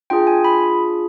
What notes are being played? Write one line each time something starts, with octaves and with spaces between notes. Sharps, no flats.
D4 F4 G#4 G5
G#5
B5